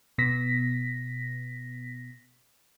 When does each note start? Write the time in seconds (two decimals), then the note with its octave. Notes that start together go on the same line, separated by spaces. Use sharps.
0.18 B2 B3 A#6 B6